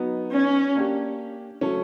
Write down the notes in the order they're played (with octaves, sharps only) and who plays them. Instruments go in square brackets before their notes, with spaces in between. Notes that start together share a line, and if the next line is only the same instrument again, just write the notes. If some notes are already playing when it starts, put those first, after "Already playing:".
Already playing: [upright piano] F#3 B3 D#4
[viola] C#4
[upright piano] A#3 D4 G4
F#3 A3 C#4